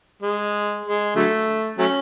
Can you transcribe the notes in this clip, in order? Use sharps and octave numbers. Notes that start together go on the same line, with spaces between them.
G#3
G#3
D3 F#3 A3
F#3 A3 C#4